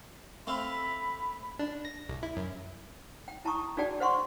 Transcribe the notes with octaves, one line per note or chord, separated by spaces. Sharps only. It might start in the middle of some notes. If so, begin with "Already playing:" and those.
A3 C4 F5 B5
D4
A#6
C2
E4
F#2
G5
E4 A5 A#5 C#6 D#6
D4 F#4 G#4 D5 G5 A5
C5 F#5 C6 C#6